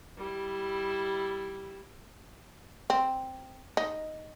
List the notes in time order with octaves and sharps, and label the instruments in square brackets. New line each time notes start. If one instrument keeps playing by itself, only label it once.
[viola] G3 E4
[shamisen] C4
D#4